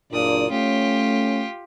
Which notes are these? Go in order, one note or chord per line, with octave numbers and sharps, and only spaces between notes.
F#1 A#2 D4 D5 D#6
A3 C#4 F4 G4